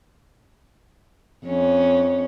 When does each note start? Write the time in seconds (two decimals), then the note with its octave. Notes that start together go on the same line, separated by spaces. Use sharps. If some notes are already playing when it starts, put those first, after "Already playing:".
1.46 F2 C#4